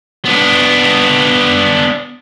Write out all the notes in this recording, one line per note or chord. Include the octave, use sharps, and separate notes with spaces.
B3 D4